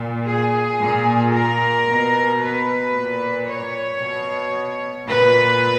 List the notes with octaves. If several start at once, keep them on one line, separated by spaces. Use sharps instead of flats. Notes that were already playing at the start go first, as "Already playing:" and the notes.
Already playing: A#2
G#4
A#2
A#4
B2
B4
A#2
C#5
B2
A#2 B4